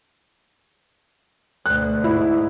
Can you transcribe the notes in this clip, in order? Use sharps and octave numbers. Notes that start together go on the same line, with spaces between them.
D2 B2 F#6
G#2 E4